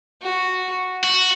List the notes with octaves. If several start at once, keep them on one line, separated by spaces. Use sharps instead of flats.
F#4
F#4